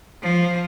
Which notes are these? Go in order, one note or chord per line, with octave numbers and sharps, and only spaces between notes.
F3